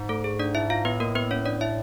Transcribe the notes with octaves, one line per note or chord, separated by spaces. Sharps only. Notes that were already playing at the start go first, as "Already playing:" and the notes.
Already playing: G#2
A3 A4
G#4
D4 D5
E4 E5
F4 F5
A2 B3 B4
A#3 A#4
B3 B4
C#4 C#5
D4 D5
E4 E5